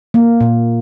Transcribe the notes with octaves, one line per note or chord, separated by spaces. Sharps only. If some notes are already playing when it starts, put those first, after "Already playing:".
A#3
A#2